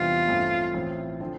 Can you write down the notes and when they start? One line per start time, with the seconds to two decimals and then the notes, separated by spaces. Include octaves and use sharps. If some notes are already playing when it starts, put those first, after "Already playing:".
Already playing: E2 C3 G3 B3 D4 F4
0.28 A1 G2 F3 A3 C4
0.74 A1 A2 F3 C4 E4
1.20 D3 F3 C4